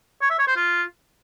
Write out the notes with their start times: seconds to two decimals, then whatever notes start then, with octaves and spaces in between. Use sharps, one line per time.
0.22 C#5
0.30 E5
0.39 C#5
0.47 C5
0.56 F4